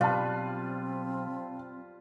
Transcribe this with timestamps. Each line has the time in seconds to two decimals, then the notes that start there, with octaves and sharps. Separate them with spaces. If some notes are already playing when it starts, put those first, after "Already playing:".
0.01 B1 G3 C4 F4 B4 F5 A5